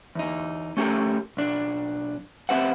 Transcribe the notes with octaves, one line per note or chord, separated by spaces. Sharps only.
E2 D#4
A3 C#4 G4 A4 A#4
B1 D4
B3 C4 G4 C5 E5 F#5